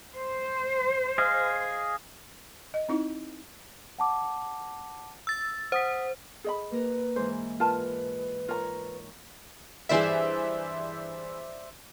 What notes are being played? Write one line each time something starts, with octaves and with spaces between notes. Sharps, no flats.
C5
G#4 D#5 F5
D#5
C4 D#4 E4
F#5 A5 D6
E6 A6
C5 F#5 D#6 B6
G#4 D#5 B5
A#3 A#4 B4
G#2 E3 C5
F4 A#4 B4 A5
F4 A#4 C#5 A#5
G2 E3 G#4 C5 D5 E5